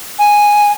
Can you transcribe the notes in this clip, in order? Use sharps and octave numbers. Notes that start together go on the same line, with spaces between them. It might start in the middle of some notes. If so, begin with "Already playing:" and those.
G#5